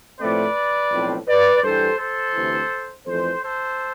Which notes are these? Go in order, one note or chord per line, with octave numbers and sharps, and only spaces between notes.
A2 F3 A3 C4 B4 D5
B1 A2 F3 C4
B4 D5
G2 E3 G3 A4 C5
A4 C5
D2 C3 E3
F2 E3 A3 A4 C5
A4 C5